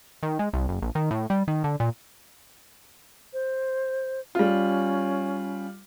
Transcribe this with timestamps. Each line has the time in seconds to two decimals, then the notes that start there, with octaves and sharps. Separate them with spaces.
0.23 D#3
0.39 G#3
0.53 C2
0.68 F#1
0.82 A#1
0.95 D#3
1.11 A2
1.30 G3
1.48 D#3
1.64 D3
1.80 A#2
3.33 C5
4.35 G3 C#4 F4